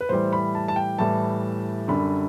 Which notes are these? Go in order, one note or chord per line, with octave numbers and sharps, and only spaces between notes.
B4
A2 E3 G3 C5
B5
A5
A5
G5
A2 E3 G3 A5
F#2 D3 G3 B5